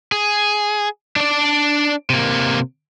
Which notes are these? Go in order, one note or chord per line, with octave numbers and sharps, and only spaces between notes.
G#4
D4 D5
C3 A#3